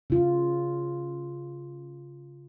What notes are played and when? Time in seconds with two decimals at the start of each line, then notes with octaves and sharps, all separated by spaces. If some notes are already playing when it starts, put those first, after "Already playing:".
0.10 C#3 F4